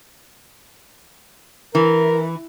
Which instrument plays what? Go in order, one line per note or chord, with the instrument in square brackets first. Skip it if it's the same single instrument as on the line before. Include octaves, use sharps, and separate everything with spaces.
[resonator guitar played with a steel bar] E3 [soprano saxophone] A#4